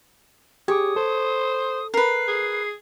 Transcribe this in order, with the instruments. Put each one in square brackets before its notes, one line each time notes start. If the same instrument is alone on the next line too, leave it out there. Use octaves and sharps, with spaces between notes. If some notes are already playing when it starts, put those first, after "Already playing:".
[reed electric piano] G4 G#4 D6 [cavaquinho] C#5 [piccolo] D#6
[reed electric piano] A4 [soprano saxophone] C5
[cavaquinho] A#4 B4 [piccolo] C7
[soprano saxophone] G#4